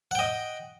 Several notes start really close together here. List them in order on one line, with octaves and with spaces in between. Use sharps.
F#5 G5 D#5